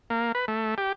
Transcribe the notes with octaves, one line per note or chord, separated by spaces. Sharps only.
A#3
B4
A3
G4